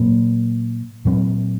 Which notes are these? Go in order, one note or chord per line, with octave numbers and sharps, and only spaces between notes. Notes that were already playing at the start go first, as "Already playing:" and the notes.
Already playing: A#2 F#3 A#3
A#2 F#3 C4